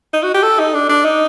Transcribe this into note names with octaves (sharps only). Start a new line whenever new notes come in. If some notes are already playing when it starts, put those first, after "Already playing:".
D#4
F#4
G4
A4
D#4
D4
D4
D#4